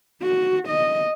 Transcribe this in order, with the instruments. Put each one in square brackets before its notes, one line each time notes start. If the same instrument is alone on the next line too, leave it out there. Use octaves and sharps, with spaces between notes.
[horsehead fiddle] F#4
D#5